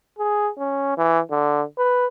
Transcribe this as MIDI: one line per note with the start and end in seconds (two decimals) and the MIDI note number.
0.19 0.49 68
0.58 0.92 61
0.97 1.20 52
1.31 1.63 50
1.78 2.06 71